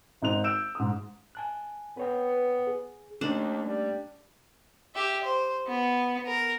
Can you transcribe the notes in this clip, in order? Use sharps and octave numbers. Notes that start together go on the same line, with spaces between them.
G#1 D#4 C5 F#6 F7
E6 G6 D7 E7
G#2 D#6
G#5 A5 F#6
B3 B4 C#5 G5
G#4
D#2 A3 A#3 C#4 D4
G3
G4 E5
C5
B3
A#4